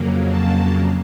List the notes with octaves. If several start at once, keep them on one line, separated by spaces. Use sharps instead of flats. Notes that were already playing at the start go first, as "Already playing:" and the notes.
Already playing: F2 C#3 F#3 A#3
A5